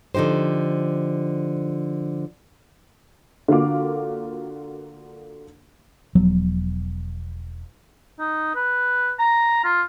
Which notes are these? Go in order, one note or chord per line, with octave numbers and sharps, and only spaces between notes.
D3 F3 D#4 G4 C5
D3 A#3 F4 F#4 F5 D6
E1 F3 F#3 B3
D#4
B4
A#5
F4